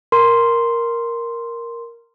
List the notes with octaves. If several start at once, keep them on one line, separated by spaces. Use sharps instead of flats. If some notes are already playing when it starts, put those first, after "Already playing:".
A#4 C6